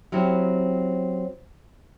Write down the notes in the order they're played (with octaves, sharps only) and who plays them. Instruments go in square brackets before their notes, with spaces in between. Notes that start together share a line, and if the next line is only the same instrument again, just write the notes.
[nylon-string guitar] F#3 C4 C#4 E4 G4